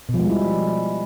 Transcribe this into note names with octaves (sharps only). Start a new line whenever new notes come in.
B2
F3
G#3
G3
E4